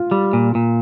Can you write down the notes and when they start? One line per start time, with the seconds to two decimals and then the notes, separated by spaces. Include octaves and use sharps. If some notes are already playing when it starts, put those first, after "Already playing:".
Already playing: F4
0.11 G3
0.33 A#2
0.55 A#2